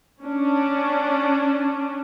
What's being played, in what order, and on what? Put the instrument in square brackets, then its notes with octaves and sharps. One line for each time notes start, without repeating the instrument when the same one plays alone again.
[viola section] C#4 D4